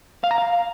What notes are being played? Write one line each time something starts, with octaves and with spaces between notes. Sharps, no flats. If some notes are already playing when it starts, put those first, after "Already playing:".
F5
A#5
F5